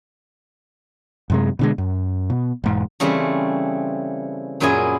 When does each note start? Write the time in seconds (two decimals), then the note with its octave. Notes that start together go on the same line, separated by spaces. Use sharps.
1.30 F#2 C3 G#3
1.59 B2 D3 G#3
1.78 F#2
2.30 B2
2.64 E1 G#2
3.00 C#3 E3 G3 A3 C4
4.60 F#2 A#2 F#3 E4 G#4 G#5